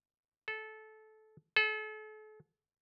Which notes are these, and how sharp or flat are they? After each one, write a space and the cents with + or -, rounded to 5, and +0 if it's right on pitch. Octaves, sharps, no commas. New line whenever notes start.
A4 -20
A4 -40